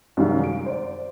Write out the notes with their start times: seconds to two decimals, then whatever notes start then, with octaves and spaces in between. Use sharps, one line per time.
0.17 F#2 C3 D#3 G3 G#3 F5
0.44 D7
0.66 C5 D5